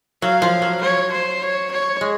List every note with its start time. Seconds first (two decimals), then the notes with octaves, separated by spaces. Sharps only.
0.22 F#3 F5
0.42 F3
0.62 F#3
0.82 C#5
1.12 C5
1.42 C#5
1.72 C#5
2.01 G#3